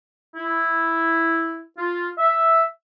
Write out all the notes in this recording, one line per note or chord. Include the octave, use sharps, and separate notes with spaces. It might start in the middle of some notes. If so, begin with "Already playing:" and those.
E4
F4
E5